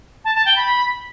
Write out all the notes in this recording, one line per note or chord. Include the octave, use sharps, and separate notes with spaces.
A5
A5
G5
B5